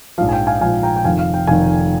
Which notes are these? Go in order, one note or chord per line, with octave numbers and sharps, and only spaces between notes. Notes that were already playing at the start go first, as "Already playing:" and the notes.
A#1 G#2 F3 F5
G#5
G5
F5 G#5
A#1 G#2 F3 F5 G#5
G5 A#5
G5
F1 F2 D#3 F5 G#5
F5
G5
F1 F2 D#3 F5 G#5